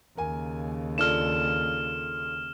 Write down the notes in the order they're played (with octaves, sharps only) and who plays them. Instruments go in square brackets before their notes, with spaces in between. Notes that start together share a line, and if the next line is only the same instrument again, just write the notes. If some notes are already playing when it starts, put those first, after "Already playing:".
[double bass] D#2 C#3 [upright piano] A#4 G#5
[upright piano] D4 F4 A4 [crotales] F6 E7